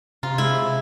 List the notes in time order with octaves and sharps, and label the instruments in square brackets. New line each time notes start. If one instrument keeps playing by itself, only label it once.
[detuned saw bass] C3 [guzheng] F4 [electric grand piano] A#5
[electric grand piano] G#3 [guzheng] E4